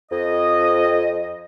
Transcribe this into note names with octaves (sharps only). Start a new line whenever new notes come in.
F2 D#5